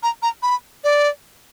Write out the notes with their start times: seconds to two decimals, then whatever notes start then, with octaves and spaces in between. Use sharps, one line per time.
0.03 A#5
0.22 A#5
0.43 B5
0.84 D5